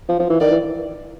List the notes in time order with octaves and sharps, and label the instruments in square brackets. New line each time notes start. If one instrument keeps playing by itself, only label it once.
[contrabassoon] F3
F3
E3
[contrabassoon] D#3 [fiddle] D5
[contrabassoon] E3